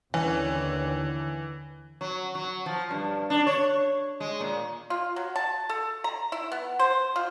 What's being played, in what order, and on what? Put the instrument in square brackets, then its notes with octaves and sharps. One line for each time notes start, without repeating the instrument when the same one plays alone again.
[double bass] D#2 D3 [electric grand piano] E3 [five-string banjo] C#4
[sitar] F#3
F#3
F3
G2
D4
C#5
G#3
A#2
[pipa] F4
F#3
A5
A4
A#5
E4
B3
C5
F4